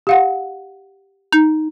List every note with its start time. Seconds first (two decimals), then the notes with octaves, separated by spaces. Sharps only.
0.07 G4 F5 F#5
1.32 D#4